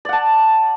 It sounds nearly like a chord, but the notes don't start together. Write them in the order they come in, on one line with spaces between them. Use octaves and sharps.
D5 F#5 A5